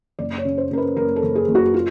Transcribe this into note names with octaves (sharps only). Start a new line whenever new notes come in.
F#1 D5
C#5
C#3
C5
C#3 A#4
B4
F#1 A#4
A4
F#1
G#4
F#1
F#4
F4